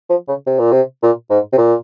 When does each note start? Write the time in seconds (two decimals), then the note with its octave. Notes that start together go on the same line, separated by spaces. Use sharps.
0.10 F3
0.28 C#3
0.46 C3
0.59 A#2
0.72 C3
1.03 A#2
1.30 G#2
1.53 C3
1.57 A#2